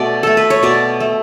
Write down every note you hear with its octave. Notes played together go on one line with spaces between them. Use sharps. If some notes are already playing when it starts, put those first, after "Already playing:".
Already playing: B2 A3 D5
A3 A4
B4
C#5
B2 D5
A3